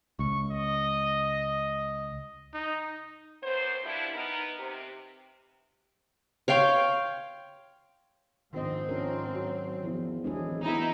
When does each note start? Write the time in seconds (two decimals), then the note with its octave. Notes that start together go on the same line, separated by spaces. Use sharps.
0.19 C#2 C#6
0.51 D#5
2.54 D#4
3.43 F#2 B3 C4 C5
3.85 F3 G3 B3 D4 E4
4.14 B3 D#4 A#4
4.59 C3
6.48 C#5 F5 G5 C6
8.53 A#1 G#2 D#3 C4 D#5
8.89 F2 C#4 D4 A#4
9.35 F#3
9.83 E2 F3
10.24 D1 E3 G#3 D4 G#4
10.62 E3 B3 D#4 E4